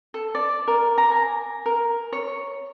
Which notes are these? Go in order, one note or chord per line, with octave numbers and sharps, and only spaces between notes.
A4
D5
A#4
A#5
G#5
A#4
C#5